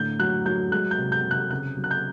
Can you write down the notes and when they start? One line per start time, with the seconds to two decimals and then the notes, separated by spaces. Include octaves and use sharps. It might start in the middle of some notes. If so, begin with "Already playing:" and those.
Already playing: A2 D3 G6
0.20 F#3 F#6
0.46 F#3 G6
0.71 G#3 F#6
0.91 G6
0.98 C3
1.12 G6
1.25 C3
1.31 F#6
1.51 C#3 F#6
1.77 F#3
1.84 F#6
1.91 G6